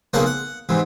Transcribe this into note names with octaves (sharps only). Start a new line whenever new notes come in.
B1 C#3 A#3 C5 F#5 A5
F#5
G#2 C3 E3